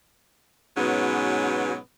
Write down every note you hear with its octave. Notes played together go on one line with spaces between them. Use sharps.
G#2 B2 F#3 B3 C#4